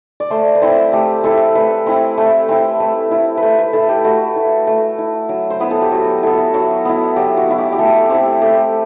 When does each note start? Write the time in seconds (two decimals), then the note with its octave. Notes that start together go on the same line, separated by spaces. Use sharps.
0.20 D5
0.30 A3 C5
0.55 B4
0.62 C4 E4 C5
0.93 A3 G4
1.24 C4 E4 A4
1.55 A3 B4
1.86 C4 E4
2.18 A3
2.49 C4 E4
2.80 A3
3.11 E4
3.37 B4
3.42 A3 C5
3.58 B4
3.73 E4 A4
3.89 G4
4.04 A3 F#4
4.36 E4
4.67 A3
4.99 E4
5.29 F#3
5.50 C5
5.60 B3 E4 B4
5.71 A4
5.82 G4
5.92 F#3 F#4
6.08 G4
6.23 B3 E4 A4
6.39 F#4
6.54 F#3 F#4
6.85 B3 E4
7.16 F#3 G4
7.37 F#4
7.48 B3 E4
7.58 G4
7.72 G4
7.79 A3 A4
8.10 C4 E4 G4
8.41 A3 G4